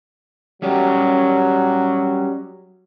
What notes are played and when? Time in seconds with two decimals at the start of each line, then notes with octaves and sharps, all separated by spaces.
0.62 F#3 G3 C#4 G4